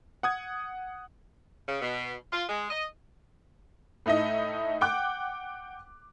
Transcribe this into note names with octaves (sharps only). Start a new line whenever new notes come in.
F#5 D#6 G#6
C#3
B2
F4
G#3
D#5
A2 A3 D#4 E4 D#5
F#5 G5 D6 F#6